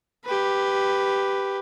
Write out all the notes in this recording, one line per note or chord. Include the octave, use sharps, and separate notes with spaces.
G4 B4